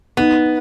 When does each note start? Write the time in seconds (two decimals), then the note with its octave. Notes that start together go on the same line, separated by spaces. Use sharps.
0.17 B3 D#4